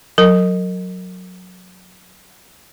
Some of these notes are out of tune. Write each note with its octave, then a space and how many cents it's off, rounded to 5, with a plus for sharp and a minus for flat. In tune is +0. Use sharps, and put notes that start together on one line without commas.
F#3 -15 A#4 -35